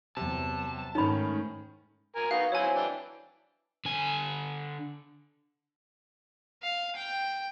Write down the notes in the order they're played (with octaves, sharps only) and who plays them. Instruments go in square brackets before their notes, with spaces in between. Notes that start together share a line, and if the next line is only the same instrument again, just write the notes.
[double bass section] E2 G2 F#3 [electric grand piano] C3 [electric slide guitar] A5
[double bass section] G#2 A3 [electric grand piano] D#3 C#4 [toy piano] D#4 B5
[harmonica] A#4 G#5
[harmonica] B3 D#4 F#4 [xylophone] F5
[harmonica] F#3 C4 E4 [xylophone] C#5 G#5
[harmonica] E3 D4 G5
[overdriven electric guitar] D3 G#5
[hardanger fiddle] F5
G5